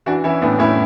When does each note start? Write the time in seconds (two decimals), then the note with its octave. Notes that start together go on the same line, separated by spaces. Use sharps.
0.06 E3 D4 F#4
0.24 E3 C#4 E4
0.41 A2 B3 D4
0.59 A2 C#4 E4